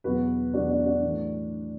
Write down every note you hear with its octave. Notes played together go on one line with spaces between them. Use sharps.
E2 B2 F#3 F#4 B4
E2 B2 F#3 D4 F#4
D4 F#4
D4 F#4
A2 E3